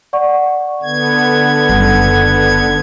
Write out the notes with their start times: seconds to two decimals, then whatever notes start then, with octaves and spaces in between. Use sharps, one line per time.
0.13 D5 F#5 C#6
0.82 D3 B3 G#6
1.69 F#1 G3